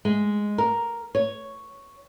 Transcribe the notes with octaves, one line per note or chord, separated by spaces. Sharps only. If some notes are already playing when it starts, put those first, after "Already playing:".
G#3
A#4
C#5